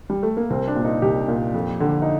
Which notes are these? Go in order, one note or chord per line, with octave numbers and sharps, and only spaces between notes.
G3
A3
A#3
C2 C4
D4
A#2
D#4
C2 G4
A#2
F2
D3
D#4